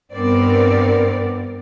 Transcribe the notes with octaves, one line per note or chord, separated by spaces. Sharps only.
G2 B3 C4 A#4 D5